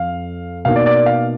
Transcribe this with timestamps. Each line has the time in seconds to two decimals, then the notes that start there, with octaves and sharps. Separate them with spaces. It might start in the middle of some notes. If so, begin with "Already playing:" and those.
Already playing: F2 F5
0.65 B2 A#3 D#4 F5
0.76 D5
0.86 D5
0.96 D5
1.06 F5